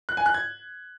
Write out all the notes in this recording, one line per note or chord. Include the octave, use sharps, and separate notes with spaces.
F#6
G#5
F#6
G#6